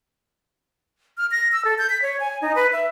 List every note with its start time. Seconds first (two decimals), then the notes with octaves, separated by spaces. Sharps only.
1.18 F6
1.31 A#6
1.52 E6
1.65 A4
1.78 G6
1.90 B6
2.02 C#5
2.20 G#5
2.42 D#4
2.55 B4
2.73 E5